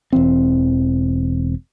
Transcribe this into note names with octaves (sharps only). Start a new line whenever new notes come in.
E1 E3 C4